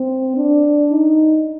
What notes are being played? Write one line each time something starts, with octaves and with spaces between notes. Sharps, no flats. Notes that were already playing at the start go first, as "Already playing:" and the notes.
Already playing: C4
D4
D#4